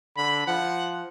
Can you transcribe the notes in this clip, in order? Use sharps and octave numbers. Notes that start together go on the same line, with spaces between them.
D3 B5
F3 F#5